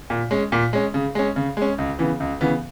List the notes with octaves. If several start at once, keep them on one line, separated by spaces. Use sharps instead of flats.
A#2
G#3 C#4
A#2
G#3 C#4
C#3
G#3 C#4
C#3
G#3 C#4
C#2
C#3 E3 B3
C#2
C#3 E3 B3